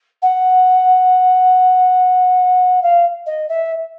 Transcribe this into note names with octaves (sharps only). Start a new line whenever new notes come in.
F#5
F5
D#5
E5